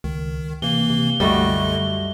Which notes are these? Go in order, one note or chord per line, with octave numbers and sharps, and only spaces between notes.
C#2 D#3
C3 E3 A#3 G7
C3
C2 F#2 D3 G3 A3 F#4 D#5